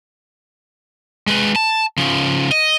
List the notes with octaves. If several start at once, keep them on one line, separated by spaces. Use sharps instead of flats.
G#3 B4
A5
C#3 F3
D#5